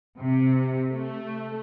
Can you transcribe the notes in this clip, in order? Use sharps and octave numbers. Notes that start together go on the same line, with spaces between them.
C3
A3